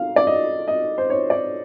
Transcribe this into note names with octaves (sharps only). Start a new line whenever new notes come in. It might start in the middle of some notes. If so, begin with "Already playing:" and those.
Already playing: F5
D5
D#5
D#5
C5
C#5
D5